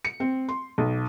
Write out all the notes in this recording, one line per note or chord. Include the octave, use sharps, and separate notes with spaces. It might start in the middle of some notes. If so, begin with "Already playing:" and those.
C#7
C4
C6
B1